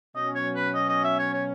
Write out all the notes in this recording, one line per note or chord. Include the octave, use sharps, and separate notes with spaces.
B2 F#3 C#4 D#5
C#5
B4
D#5
D#5
E5
C#5
C#5